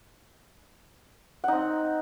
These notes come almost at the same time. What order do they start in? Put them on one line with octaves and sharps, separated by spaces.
F#5 D#4 C4